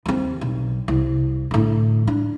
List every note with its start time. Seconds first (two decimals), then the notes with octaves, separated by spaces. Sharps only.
0.06 D#2 C4
0.41 B1
0.88 C2
1.51 A2 D3
2.07 D4